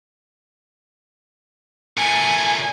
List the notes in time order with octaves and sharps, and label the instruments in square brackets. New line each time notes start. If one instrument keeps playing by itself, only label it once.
[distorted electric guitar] A#2 A3 [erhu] G#5